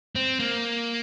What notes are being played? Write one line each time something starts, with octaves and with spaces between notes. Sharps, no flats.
C4
A#3